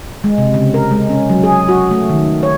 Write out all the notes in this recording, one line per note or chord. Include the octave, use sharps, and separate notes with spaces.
G#3
C3
C#3
A#4
G#3
C#4
F#3
G#4
F#4
A3
D#3
C#5